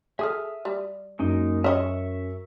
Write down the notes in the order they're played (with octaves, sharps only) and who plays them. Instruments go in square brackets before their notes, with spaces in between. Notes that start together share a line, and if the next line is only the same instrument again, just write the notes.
[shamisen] G#4 A4 [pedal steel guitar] E5 D#6 F6
[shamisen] G3
[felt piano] F#2 [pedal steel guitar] G#3 A#3 D#4
[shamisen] C#4 D#5 [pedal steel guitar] E5 C#6